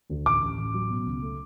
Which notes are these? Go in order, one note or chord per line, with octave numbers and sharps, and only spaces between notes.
D2
A1 D6
A1
A1
F#3
B2
C#2
A3